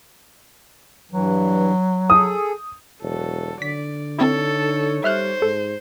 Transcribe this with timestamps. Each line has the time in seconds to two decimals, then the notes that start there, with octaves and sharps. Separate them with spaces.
1.11 G2 E3 F#3
2.10 G#4 A4 D#6
3.02 E1 F#3 A4
3.62 D3 D5 B6
4.18 C4 D#4 E4 A4 C#5
5.04 G3 C5 E5 F6 F#6
5.42 G#2 A4